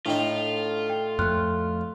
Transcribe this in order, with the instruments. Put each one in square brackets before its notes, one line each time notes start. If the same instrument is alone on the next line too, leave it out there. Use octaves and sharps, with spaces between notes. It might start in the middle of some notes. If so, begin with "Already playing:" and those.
[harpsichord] A2 D#4 [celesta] D4 G5 [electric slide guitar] F4
[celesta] G5
[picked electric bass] F2 A3 [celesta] C6 F6 F#6